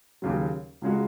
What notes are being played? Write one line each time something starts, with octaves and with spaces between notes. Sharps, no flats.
D#2 C#3 F#3
C#2 C#3 G#3 F#4